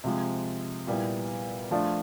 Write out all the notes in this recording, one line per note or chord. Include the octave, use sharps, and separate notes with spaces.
C3 F3 G#3
A#2 G3 B3 E4
F3 A3 D4 F4